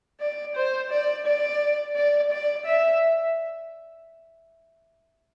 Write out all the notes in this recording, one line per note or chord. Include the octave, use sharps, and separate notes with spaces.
D5
C5
D5
D5
D5
D5
E5